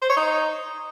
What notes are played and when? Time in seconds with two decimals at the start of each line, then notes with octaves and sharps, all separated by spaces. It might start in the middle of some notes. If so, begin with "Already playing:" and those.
0.02 C5
0.10 C#5
0.17 D#4